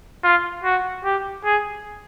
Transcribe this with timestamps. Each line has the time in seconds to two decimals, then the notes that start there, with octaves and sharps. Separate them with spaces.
0.24 F4
0.64 F#4
1.05 G4
1.45 G#4